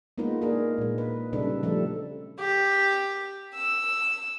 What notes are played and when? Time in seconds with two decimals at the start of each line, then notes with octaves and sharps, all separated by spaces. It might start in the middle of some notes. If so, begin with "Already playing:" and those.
0.18 G#3 A#3 B3 D#4 F4 B4
0.42 A#3 D4 D#4 G#4 A#4
0.78 A#2 G#3
0.98 B4
1.33 C#3 G3 D4 D#4 A4 B4
1.63 F3 G3 A3 C4 D4 A4
2.40 G4
3.55 E6